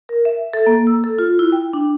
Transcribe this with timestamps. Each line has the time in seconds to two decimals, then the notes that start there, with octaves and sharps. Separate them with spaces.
0.09 A#4
0.25 E5
0.54 A4
0.67 A#3
0.87 E6
1.04 A4
1.19 F4
1.39 E4
1.52 G5
1.73 D4